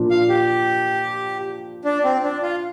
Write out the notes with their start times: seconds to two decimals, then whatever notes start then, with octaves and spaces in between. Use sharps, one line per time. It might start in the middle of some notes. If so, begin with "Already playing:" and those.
Already playing: A#2 F3 D4 F4
0.11 F5
0.29 G4
1.85 D4
2.04 C4
2.24 D4
2.42 F4